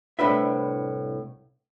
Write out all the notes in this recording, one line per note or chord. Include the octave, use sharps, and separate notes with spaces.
C2 A2 D4 B4 E5